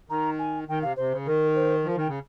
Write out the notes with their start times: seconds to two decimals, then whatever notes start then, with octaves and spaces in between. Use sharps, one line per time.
0.10 D#3 A#5
0.39 G#5
0.68 D#3 G5
0.82 C3 F5
0.97 C3 C5
1.12 C#3
1.26 D#3 A#4
1.55 C5
1.85 F3 A#4
1.96 D#3 G5
2.08 C#3